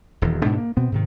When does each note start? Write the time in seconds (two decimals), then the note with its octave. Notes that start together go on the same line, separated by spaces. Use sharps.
0.22 D#1 E2 D#3
0.42 G#2 B2 G#3 D4
0.58 A#3
0.77 B2 B3 C4
0.92 G#2 C3 D#3